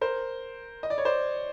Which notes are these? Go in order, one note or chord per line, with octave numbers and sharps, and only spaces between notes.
A#4 C5
D#5
D5
C#5
C5 D5